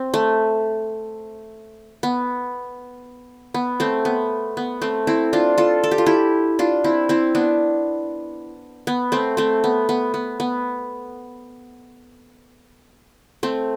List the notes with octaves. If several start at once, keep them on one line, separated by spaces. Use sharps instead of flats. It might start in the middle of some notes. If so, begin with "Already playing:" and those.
Already playing: C4
A3
B3
B3
A3 C4
B3
B3
A3 C4
C4 E4
D4 F4
F4 A4
A4
G4
F4
E4 G4
D4 F4
C4 E4
C4 E4
B3 D4
B3
A3 C4
A3 C4
B3
B3
B3
B3
A3 C4